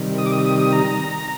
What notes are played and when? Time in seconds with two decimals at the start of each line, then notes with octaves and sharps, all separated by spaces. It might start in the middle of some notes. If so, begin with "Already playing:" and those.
Already playing: C3 D#3 G3
0.18 D#6
0.26 D6
0.32 D#6
0.46 D#6
0.59 D#6
0.72 A#5